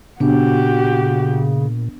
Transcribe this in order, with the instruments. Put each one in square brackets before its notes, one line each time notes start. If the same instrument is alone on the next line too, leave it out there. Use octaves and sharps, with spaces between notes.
[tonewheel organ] A#2 [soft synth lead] C#3 [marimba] B3 D4 [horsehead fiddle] F#4 G4